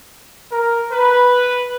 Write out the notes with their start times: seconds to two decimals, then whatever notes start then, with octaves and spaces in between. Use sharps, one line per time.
0.51 A#4
0.92 B4